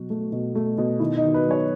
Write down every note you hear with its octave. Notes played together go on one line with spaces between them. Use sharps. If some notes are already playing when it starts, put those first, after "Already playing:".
Already playing: B2 F#3 F#4
A3
B2
A3
B2
D#3 E4
D#4
D#3
B4
F#3 C#5